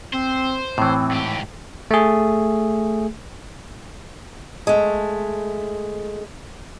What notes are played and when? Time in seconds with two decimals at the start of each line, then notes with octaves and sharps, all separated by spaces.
0.13 C4 C5
0.78 A2 E3 C4
1.11 G#2 G4
1.91 A3 G#4
4.67 G#3 A3